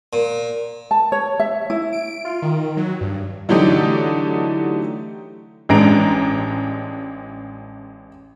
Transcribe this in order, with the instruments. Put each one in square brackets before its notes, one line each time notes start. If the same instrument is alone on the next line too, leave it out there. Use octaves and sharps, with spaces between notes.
[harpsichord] A#2
[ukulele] A5
C#5
E5
E4
[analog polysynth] D7
F4
D#3
F#3
G2
[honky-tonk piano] D3 E3 F#3 A3 D#4 G4
A1 G#3 D4 A#5 D7